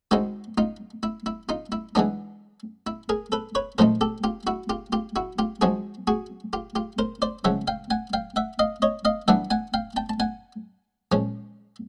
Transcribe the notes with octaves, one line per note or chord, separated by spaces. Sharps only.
D#3 G#3 C4 D#4 E4 F#4
D#4 F4
E4
E4
D#4 F4
E4
E3 G#3 B3 D4 D#4
E4
G#4 A#4
A4 B4
B4 C#5
A#2 F3 A3 C4 D#4 A#4 C5
G4 A4
F4 G4
E4 F#4
F4 G4
F4 G4
E4 F#4
F4 G4
F3 G#3 C4 D#4 F#4 G#4
F#4 G#4
F4 G4
F4 G4
A#4 C5
C5 D5
C#3 F3 G#3 C#4 E5 F#5
F5 G5
F#5 G#5
F5 G5
E5 F#5
D#5 F5
C#5 D#5
D#5 F5
E3 G3 B3 D4 E5 F#5
F#5 G#5
F5 G5
G5 A5
A5
F#5 G#5
A#2 F3 G#3 C#4